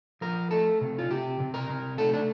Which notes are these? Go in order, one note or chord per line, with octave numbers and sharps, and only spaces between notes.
F3 A#4
A3 A4
C3
F4
C3 G4
C3
A#4
C3
A3 A4
D4